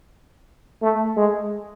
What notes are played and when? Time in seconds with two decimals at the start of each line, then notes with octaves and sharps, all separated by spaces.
0.82 A3
1.17 G#3